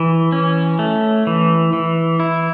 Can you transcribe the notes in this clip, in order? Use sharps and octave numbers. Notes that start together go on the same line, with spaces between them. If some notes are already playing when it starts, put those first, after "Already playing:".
Already playing: E3
C#4
A3
E3
E3
E4